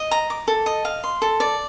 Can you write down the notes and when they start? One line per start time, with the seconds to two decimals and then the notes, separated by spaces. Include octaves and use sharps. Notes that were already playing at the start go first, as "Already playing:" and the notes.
Already playing: D#5
0.11 A#5
0.30 D6
0.48 A4
0.66 D#5
0.85 F5
1.04 C6
1.22 A4
1.40 D5